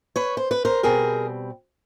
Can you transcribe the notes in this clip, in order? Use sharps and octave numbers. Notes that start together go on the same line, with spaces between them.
B4 C#5
C5
B4
A#4 C5
B2 G3 C4 G#4 A#4